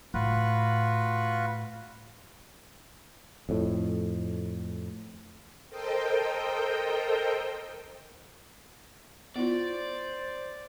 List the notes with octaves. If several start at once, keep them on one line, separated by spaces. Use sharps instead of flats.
A2 F4 F#4 B4
F2 A2
A4 A#4 C5 D#5 G5
B3 E4 F4 C5 D5